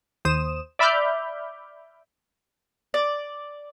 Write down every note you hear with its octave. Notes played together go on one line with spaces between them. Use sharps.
D#2 C5 D#6 E7
D5 E5 B5 D6 F6 G6
D5